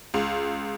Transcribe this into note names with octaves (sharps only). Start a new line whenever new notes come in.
C#2